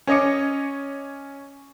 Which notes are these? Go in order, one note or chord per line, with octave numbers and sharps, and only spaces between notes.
C#4 C#5 D#5 D6 C#7